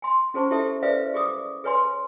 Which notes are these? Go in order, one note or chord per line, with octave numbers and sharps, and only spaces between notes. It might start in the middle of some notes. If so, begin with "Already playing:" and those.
G#5 C6
C#4 G#4 C5 A5 C#6
E4 G4 A4 E5 A5
G#4 B4 C5 D5 E5 F5
G4 G#4 D6 D#6
G#4 B4 C#5 G#5 C6